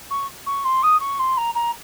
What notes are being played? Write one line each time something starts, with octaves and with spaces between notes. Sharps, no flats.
C#6
C#6
C6
D#6
C#6
C6
A#5
A#5